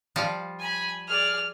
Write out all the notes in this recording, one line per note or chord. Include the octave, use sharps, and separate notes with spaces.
F3 G3 F4
G#5 B5
G#4 D5 F6